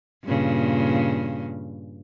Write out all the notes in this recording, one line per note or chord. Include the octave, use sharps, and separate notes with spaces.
G2 A#2 C#3